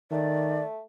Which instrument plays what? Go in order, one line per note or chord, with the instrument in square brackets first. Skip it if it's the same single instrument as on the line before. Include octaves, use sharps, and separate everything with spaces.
[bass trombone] D#3 [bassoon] A3 [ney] D5